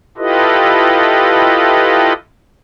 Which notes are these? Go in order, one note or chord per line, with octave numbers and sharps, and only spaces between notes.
E4 F4 G4 A4 B4 D#5